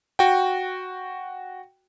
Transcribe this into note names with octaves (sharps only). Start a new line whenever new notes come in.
F#4 G5